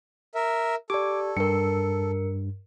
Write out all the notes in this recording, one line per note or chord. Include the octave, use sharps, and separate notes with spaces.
A#4 E5
G4 A4 D5 D6
G2 A#4 C#7